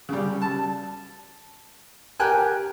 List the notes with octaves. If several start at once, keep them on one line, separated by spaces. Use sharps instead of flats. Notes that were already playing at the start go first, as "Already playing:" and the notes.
C#3 G3
A5
G4 A#4 G5 G#5 F#6